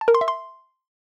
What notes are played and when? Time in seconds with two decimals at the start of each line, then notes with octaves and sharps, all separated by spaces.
0.01 A5
0.08 A#4
0.15 C6
0.21 E5
0.28 C6